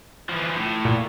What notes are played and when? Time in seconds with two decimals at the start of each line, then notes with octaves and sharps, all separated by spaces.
0.29 E3 F3
0.58 A2
0.85 A#2